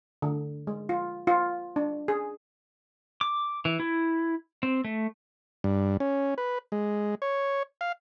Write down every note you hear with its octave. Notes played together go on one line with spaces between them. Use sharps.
D3
G#3
F4
F4
D4
G#4
D6
E3
E4
C4
A3
G2
C#4
B4
G#3
C#5
F5